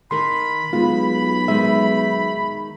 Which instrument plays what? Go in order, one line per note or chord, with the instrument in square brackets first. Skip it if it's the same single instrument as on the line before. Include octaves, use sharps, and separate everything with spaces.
[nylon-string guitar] D#3 A#4 [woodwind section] B5 [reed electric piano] C6
[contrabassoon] B1 [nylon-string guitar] G#3 [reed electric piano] F4
[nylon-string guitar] D#3 G#3 [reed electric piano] E5